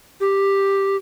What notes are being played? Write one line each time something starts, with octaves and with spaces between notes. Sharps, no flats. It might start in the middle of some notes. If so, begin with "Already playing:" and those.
G4